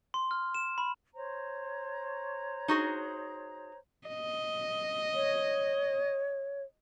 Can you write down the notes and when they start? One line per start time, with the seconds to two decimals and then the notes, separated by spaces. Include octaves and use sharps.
0.14 C6
0.31 F6
0.55 E7
0.78 B5
1.15 C5 C#5 A#5
2.68 D#4 F#4 G#4
4.08 D#5
5.14 C#5